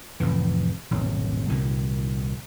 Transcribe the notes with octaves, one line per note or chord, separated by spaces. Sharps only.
F1 A2 E3
D#1 G#1 B2 F#3
C2 A#2 D#3